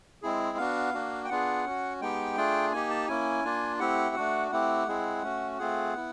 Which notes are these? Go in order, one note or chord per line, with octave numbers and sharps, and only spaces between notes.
G#3 C4 E4 G#4
B3 D4 F#4 F5
A#3 D4 F#4
G5
B3 D4 F4 G#4 F#5
C#4 F#4
G#3 B3 D#4 G4 G5
A3 D4 F4 G#4
A#3 D#4 G4 G#5
A5
A#3 C#4 E4 G#5
A#3 D4 F4
A3 C4 E4 G4 F#5
A3 D4 F#4
A3 C4 E4 G4 F#5
G#3 C4 E4 G#4
A3 C#4 F#4
A3 C4 F4 G#4 F#5
B3 E4